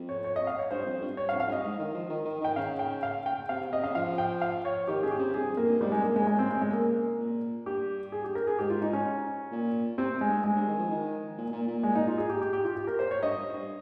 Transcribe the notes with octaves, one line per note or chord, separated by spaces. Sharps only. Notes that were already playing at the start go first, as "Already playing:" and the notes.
Already playing: F2
C#5
C#5
D#5
F5
C#5
G2 C5
F2
G2
G2 C#5
F5
F2
F5
G2 D#5
G#2
D#3
F3
D#3
D#3
D#3 G5
C#3 F5
G5
F5
G5
C3 F5
C3
C3 D#5
C#3 F5
F3 F5
G5
F5
C#5
D#3 G4
C#3 G#4
G4
C3
G2 G#4
F2
A#3
G2
G#2 G3
G#3
C3
A#3
C#3 G#3
G#3
C4
G#3
G#3
A#3
A#2
G2 G4
G#4
G4
A#4
G#4
G#2 G4
F4
D#4
C#4
A#2
C3 C4
G#3
G2
G#3
G2
D#3
F3
D#3
A#2
A#2
A#2
G#3
D#4
F4
G#4
G4
G4
G4
F4
G4
A#4
C5
C#5
G2 D#5
G2
G2